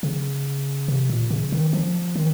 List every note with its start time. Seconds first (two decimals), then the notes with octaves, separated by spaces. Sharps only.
0.03 C#3
0.88 C3
1.10 A#2
1.30 C#3
1.52 D#3
1.73 F3
2.16 D#3